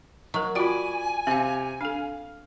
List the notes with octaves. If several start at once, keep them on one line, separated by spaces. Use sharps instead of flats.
F#3 A#4 D#5
F4 F#4 D5 G5 G#5 B5
C3 C4 F5
D4 A4 F5